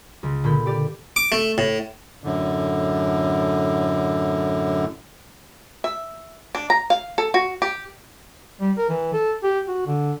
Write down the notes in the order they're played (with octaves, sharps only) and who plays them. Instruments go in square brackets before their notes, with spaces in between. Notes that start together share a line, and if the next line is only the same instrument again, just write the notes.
[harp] C#2
A#2 D3 B5 G6
G4 D5
[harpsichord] D6
A3
A2
[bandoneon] F#2 A2 D3
[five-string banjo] E5
D4
A#5
F5
A4
F#4
G4
[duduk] G3
A#4
E3
A4
G4
F#4
D3